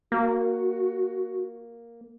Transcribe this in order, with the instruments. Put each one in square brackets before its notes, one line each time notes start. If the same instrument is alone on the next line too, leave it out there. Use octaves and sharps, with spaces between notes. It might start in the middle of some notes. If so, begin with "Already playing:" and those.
[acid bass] A#3 [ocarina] F#4